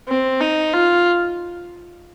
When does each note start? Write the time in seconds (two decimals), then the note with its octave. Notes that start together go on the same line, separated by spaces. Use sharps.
0.08 C4
0.40 D#4
0.73 F4